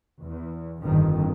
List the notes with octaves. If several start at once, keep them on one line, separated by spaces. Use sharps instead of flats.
E2
G1 F2 D#3